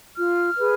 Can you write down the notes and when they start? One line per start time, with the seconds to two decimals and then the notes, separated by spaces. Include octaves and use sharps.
0.17 F4 F6
0.57 G#4 B4